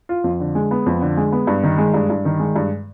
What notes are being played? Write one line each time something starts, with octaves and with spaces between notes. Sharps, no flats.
F4
F2
D3
G#3
B3
F2
D3
G#3
B3
G2
D#3
G#3
G2
G2
D#3
G#3
G2